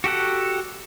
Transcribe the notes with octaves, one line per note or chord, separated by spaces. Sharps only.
F#4 G4 A4 F#5